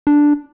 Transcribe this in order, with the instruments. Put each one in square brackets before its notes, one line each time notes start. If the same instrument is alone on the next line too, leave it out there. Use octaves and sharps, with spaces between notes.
[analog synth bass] D4